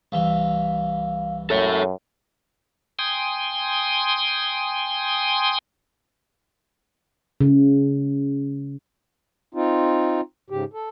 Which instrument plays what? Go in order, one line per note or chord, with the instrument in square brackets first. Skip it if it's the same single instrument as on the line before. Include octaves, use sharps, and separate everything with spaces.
[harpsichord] C2 E3 [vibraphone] F5
[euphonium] F#2 [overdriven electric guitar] A4 C#5
[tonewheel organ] G5 G#5 C6 D#6
[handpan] C#3
[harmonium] C4 D#4 F4
G#2 C#3 G4
A4